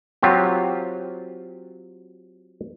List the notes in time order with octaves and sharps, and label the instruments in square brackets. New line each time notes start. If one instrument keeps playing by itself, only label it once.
[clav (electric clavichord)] F#3 C4 F4 G4